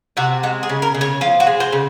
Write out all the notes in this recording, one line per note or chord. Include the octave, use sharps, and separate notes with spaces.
C3 F#4
G#3 F#4
G#4
C#3
A#4
C#3
C#5
F3 F4
F#4
G#3
C5
C#3